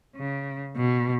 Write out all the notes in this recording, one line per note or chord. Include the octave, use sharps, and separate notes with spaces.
C#3
B2